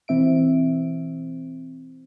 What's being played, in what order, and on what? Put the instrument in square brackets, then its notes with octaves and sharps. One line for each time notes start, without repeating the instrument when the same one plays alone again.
[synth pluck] B2 E3 C4 E5 D7